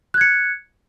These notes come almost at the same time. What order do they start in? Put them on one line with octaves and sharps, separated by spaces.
F#6 G#6 C#7